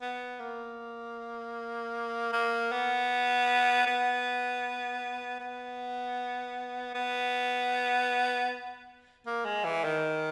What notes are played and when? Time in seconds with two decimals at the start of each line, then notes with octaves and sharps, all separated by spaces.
0.01 B3
0.40 A#3
2.33 A#3
2.72 B3
3.87 B3
5.40 B3
6.95 B3
9.26 A#3
9.45 G#3
9.64 E3
9.84 D#3